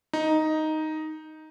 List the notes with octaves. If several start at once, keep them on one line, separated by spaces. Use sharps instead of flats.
D#4